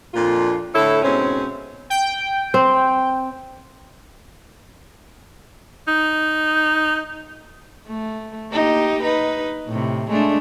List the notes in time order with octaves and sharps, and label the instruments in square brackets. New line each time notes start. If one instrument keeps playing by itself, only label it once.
[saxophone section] F2 A#2 D4 F4
A2 D3 E4 A4 C#5
G#2 B2 C4 C#4
[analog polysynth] G5
[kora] C4
[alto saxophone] D#4
[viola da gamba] A3
A#3 D#4 G4
D#4 B4
A2 C3
G#3 A3 D4